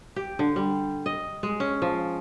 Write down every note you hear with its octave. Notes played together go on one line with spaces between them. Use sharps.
G4
D3
G3
D#5
G#3
C#4
F3